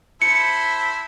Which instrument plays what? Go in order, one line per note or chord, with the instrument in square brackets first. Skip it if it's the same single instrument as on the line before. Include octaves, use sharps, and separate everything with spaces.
[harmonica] E4 A4 C5 [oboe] B5 [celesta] C#7